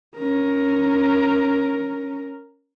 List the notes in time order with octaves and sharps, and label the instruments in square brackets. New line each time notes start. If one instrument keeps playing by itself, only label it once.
[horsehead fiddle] C#4 A#4